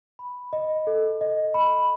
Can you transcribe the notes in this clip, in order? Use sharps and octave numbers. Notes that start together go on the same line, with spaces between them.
B5
D#5
A4
D#5
B5